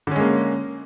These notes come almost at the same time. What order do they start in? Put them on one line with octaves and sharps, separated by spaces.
D3 C#4 G#3 A#3